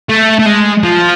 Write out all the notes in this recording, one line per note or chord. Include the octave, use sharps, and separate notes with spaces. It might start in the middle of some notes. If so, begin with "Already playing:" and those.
A3
A3
G#3
F3